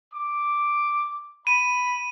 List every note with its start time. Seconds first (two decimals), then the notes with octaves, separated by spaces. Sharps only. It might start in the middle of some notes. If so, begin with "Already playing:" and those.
0.13 D6
1.47 B5 D#7